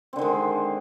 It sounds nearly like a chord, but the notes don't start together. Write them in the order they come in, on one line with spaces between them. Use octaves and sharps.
C4 D3 D#3 G#3